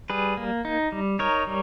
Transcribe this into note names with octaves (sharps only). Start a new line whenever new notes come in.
G3 G#4 B4
A#3
D#4
G3
D#4 A#4 C#5
G3